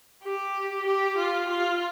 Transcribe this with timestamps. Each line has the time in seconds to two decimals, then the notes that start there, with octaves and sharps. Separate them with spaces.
0.24 G4
0.86 G4
1.18 F4
1.49 F4